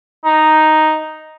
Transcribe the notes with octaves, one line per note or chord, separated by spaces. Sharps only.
D#4